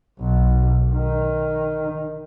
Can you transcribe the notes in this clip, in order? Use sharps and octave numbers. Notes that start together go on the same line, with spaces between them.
B1
D#3